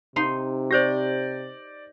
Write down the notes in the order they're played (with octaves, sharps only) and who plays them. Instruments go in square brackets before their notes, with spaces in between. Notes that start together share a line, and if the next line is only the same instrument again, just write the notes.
[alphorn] C3 [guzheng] D#4 C6
[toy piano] G4 C5 [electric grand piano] D5 G6 A#6